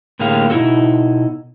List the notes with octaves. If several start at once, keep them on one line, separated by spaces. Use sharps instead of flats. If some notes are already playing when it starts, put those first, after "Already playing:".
A2 D3 A#3 G4 G#4 F5
B2 D#4 E4 F#4 A4